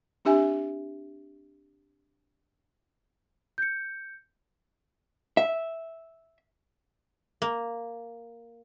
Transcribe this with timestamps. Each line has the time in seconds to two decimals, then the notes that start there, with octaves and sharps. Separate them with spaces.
0.25 C4 D4 G4 E5 G#5
3.58 G6 C#7
5.37 E5
7.42 A#3